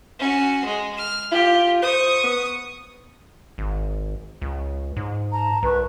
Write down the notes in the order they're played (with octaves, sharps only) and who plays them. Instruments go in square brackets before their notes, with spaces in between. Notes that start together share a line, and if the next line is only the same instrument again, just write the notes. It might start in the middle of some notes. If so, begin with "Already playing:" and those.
[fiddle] C#4 F#4
G#3
F6
[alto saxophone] F4 [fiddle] G4
[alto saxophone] C5 [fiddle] C#6 D#6
[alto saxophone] B3
[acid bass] G#1
C#2
G#2
[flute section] A5 A#5
[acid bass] C2 [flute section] B4 C#6